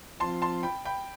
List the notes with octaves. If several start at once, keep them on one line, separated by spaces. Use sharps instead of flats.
F3 C4 F4 A5 C6
A5 C6
G5 B5
G5 B5